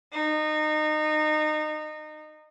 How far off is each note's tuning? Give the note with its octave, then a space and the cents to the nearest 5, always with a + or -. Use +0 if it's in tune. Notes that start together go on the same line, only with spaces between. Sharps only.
D#4 -25